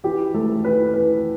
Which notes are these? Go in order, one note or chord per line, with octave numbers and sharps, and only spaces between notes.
E3 G4
A3 A4
E3 B4
E3 B4